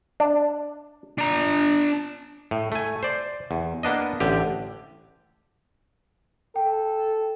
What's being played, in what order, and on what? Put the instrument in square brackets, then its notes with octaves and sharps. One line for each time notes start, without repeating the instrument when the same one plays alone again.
[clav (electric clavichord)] D4
[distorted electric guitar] D4 A#5
[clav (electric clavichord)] A2
A3 G#5
C5 D5
E2
A#3 B3 D4 D#5
A1 D3 G4
[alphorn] A4 [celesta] G5